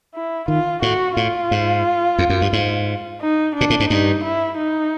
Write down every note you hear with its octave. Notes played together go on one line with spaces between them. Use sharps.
E4
D#3 F4
A2 F#4
A2 F4
G#2
F2
F#2
G2
G#2
D#4
A#2 D4
A2
G#2
G2 D#4
E4
D#4